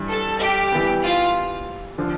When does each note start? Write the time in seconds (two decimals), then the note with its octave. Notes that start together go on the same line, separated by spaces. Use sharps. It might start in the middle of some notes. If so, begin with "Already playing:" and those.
Already playing: G2 E3 G3
0.09 A4
0.40 G4
0.72 E3 G3 B3
1.03 F4
1.98 D3 F3